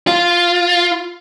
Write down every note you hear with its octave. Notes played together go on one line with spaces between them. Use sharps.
F4